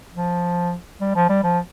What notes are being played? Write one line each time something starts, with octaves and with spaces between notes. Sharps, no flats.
F3
G3
F3
G3
F3